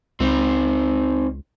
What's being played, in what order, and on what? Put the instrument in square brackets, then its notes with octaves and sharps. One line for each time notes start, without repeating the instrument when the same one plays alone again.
[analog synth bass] C#2 [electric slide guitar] C4 D#4